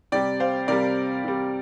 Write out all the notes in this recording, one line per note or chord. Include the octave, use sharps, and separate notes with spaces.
C3 G3 D5 G5
C5 F5
C3 G3 A#4 D5
C3 G3